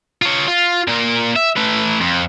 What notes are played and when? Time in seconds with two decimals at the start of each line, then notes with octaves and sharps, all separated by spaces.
0.22 F4 C#5
0.48 F4
0.88 A#2 A#4
1.36 E5
1.57 A3 B4
2.01 F2